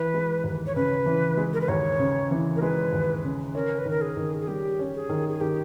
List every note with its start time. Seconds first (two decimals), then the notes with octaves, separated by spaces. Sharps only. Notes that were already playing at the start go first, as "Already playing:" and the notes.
Already playing: E3 B4
0.14 G#3
0.44 D#2
0.66 C#5
0.75 C#3 B4
1.06 E3
1.37 G#3
1.54 A#4
1.61 B4
1.68 D#2 C#5
1.99 C#3
2.31 E3
2.56 A#4
2.62 G#3 B4
2.93 D#2
3.24 C#3
3.55 C#4 A#4
3.79 B4
3.85 D#3 A#4
4.01 G#4
4.17 D#3
4.41 G#4
4.48 G3 G4
4.79 C#4
4.95 G#4
5.09 D#3
5.29 G#4
5.41 D#3 G4